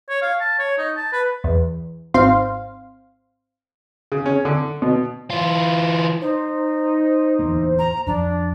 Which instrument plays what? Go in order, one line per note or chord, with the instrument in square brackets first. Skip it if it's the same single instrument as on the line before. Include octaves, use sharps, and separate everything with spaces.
[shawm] C#5
F5
A5
C#5
D#4
A5
B4
[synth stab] E2
G#1 C4 F5 C6
[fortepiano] C#3
C#4
D3
B2
[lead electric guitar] E3 F4
[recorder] D#4 [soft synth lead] C5
[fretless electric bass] D1 E2 A#3
[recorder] A#5
[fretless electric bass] F2 F3 [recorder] D4